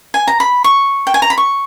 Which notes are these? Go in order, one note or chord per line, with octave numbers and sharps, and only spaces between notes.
G#5
A#5
B5
C#6
G5
G#5
A#5
B5
C#6